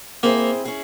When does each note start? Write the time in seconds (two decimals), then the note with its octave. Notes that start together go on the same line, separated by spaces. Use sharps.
0.23 A#3 C4 E4 G#4 C5 E5
0.65 C#4 E4 G#4